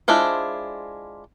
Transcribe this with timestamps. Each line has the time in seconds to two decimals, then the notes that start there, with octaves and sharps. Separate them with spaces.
0.08 G#3 D4 E4 F4 C5